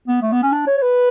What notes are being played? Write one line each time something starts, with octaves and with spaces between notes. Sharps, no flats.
B3
A3
B3
C#4
D4
C#5
C#5
B4